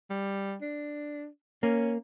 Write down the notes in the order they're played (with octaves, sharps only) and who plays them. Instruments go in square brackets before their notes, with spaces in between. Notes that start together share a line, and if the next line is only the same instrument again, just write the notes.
[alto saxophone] G3
D4
[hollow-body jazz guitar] A#3 [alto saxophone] C#4